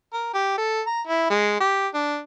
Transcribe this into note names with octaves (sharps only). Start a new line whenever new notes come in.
A#4
G4
A4
A#5
E4
G#3
G4
D4